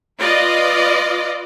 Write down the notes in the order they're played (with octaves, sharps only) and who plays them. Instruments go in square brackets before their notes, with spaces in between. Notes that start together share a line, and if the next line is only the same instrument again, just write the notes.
[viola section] F4 B4 D5 D#5